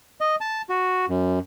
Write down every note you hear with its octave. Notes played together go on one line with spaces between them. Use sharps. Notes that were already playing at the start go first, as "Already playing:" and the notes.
D#5
A5
F#4
F#2